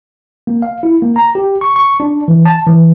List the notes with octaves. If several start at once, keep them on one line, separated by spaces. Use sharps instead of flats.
A#3
F5
E4
A#3
A#5
G4
C#6
C#6
D4
E3
A5
E3